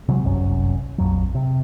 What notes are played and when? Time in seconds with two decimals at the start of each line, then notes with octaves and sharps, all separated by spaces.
0.08 C3 F#3 G#3
0.23 G1 C2 F#2 C#4
0.98 A#1 F2 F#3
1.35 C3